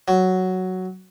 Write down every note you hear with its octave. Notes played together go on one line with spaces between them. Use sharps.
F#3